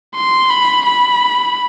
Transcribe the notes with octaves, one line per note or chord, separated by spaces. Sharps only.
C6
B5
B5